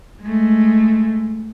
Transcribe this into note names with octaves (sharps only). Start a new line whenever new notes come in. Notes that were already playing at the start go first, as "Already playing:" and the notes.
G#3 A3